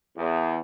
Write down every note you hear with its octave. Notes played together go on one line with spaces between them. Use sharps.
E2